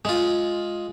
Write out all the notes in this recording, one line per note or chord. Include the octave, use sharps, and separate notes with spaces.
G#3 F4